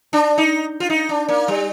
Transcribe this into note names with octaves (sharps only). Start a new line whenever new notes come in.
D4
D#4
F4
D#4
D4
A#3
G3